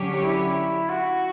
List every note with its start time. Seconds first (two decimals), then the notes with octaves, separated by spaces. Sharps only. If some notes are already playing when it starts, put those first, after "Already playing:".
Already playing: D3 F#3 C#4 G4 C#5
0.23 E4
0.90 F#4